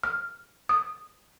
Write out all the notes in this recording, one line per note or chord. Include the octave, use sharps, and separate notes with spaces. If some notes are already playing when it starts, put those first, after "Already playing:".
F6
D#6